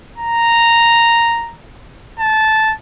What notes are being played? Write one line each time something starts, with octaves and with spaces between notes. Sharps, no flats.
A#5
A5